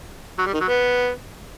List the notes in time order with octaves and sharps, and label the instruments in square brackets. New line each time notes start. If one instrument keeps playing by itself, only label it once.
[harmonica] F#3
G3
D#3
F#3
B3